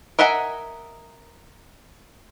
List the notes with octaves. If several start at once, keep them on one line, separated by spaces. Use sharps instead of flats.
A#4 D#5 E5 F#5 G#5